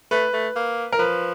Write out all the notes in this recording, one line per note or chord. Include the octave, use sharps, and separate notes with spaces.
A3 B4
A3
A#3
A#4
F3 B4